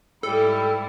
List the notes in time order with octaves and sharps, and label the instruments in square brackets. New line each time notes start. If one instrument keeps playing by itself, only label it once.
[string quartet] G#2 G3 E4 [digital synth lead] A4